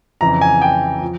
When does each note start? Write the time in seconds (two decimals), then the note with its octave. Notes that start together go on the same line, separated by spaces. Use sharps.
0.21 F2 C#3 E3 A#5
0.41 G#5
0.61 G5
1.02 F3